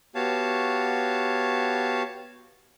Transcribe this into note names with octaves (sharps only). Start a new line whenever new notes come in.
B3 F#4 G4 C#5 F5 A5